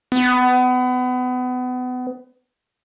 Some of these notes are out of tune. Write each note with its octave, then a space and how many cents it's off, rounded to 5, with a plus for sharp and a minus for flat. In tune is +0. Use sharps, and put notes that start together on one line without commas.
B3 +30